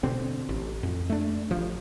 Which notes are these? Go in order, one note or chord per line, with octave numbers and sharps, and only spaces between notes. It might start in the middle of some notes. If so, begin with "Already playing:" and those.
B2 D3 C4
A1
F2
A3 D4
A1 F3